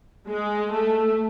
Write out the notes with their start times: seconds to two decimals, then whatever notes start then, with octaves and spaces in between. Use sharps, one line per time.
0.29 G#3
0.72 A3